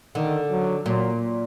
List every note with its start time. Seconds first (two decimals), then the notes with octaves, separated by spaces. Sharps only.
0.15 D3 D#3
0.51 F#3
0.86 A#2 F#3